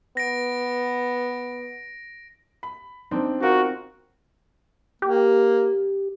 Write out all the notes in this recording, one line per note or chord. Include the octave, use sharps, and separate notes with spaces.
B3 A#6 D7
B5
C4 D4 D#4
D#4 F4 F#4 A#4
A#3 G4